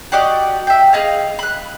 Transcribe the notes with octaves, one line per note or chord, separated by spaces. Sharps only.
F#4 G4 D5 D#5
E5 G5
G#4 D#5 F5
B5 F#6